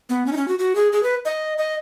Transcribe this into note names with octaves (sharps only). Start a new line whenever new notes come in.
B3
C#4
D#4
C#4
F#4
F#4
G#4
G#4
B4
D#5
D#5